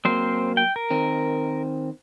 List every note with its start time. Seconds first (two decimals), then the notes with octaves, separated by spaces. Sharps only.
0.05 F#3 A#3 C4 C5
0.57 G5
0.76 A#4
0.90 D#3 C4